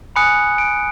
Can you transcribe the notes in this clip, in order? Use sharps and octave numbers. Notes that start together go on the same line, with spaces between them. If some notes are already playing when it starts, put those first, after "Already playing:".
G#5 B5 D#6 F#6 C#7
D7